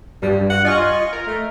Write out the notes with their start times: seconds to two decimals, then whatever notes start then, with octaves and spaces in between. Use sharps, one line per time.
0.23 G2 G3
0.50 F#5
0.65 F4 D#5 G#5 C#6
1.13 A#4
1.27 A3